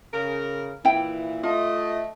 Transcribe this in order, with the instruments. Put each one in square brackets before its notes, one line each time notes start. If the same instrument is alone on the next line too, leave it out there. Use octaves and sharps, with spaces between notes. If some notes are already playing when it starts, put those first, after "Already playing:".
[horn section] C#3 A#4
[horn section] A#2 E3 [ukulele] E4 G5
[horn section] A3 D#5 [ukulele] F4